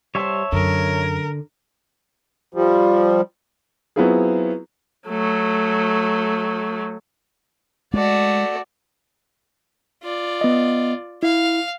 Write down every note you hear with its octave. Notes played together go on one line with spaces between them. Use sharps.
G3 C5 C#5 E5 A5
F#2 D3 A#4
F3 G3
F#3 B3 C4 E4 F4 G#4
F#3 A3
G#3 A3 F#4 D5
F4 D5
B3 D#5
E4 F5